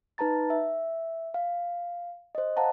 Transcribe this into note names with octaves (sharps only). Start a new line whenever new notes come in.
D#4 B4 A5 A#5 A6
E5
F5
C5 D#5
C5 F5 F#5 A5 A#5